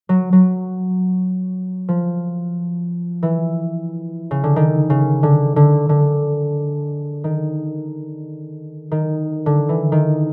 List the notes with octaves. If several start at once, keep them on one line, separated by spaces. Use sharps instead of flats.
F#3
F#3
F3
E3
C#3
D3
D#3
C#3
D3
D3
D3
D#3
D#3
D3
E3
D#3